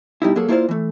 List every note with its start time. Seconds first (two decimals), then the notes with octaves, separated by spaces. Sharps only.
0.22 B2 G3 D#4 E4
0.36 F#3 A#3 G#4 A4
0.48 A#3 E4 F4 G#4 C5 D5
0.69 E3 A3